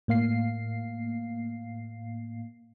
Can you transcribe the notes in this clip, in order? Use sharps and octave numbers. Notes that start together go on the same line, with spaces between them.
A2 A#3 F5 C7